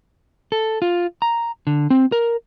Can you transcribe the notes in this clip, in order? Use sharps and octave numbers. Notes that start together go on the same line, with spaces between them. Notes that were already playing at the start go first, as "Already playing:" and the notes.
A4
F4
A#5
D3
C4
A#4